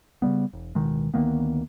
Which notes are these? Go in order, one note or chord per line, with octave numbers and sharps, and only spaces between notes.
C#3 F#3 G3 B3
E1
D1 B2 D#3 G#3
D2 D#3 A#3 B3